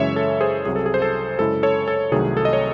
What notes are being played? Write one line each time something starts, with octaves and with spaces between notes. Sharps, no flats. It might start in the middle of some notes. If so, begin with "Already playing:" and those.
Already playing: F#2 C#3 E3 G#3 C#5 E5
A4
G#4 C5
C2 C3 F#3 G#4
A4
G#4
C5
A4
F#2 C#3 G#3 C#4 E4 A4
A4 C#5
A4
C2 C3 D#3 F#3 A3 G#4
A4
D#5
C#5